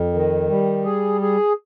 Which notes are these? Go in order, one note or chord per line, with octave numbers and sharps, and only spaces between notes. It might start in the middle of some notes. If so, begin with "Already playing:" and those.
Already playing: F2
D#3
G3
G#4
G#4